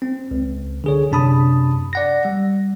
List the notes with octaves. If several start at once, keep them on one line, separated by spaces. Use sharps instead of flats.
C4
C#2
D3 G#4 C#5
F#2 C3 D4 A5 B5 D#6
D5 F#5 A#6
G3